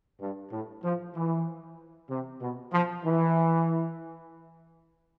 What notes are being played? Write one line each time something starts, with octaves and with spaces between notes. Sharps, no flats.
G2
A2
F3
E3
C3
B2
F3
E3